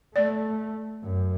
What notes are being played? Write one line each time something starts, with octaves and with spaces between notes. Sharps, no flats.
A3 D5
F#2